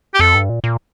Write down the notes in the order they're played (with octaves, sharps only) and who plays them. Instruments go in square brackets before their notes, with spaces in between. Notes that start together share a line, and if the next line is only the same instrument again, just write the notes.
[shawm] G4
[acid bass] F2 [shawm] A4
[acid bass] G2
A#2
A#2